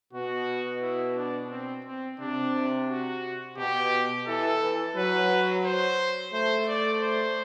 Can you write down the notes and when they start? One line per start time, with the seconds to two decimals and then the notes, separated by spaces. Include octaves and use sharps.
0.13 B2 F#4
0.82 E4
1.16 D4
1.50 C4
1.85 C4
2.19 C3 D4
2.89 F#4
3.57 B2 G4
4.27 E3 A4
4.61 E3
4.95 F#3 B4
5.65 C5
6.33 A3 C5
6.68 D5
7.02 C5